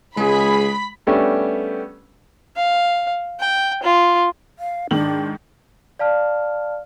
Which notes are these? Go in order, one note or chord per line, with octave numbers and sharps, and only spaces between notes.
C#2 G#3 G#4 B5
G3 A3 B3 C#4 D4 G4
F5
G5
F4
F5
G#2 D#3 D4 F#7
D5 F5 A5 F6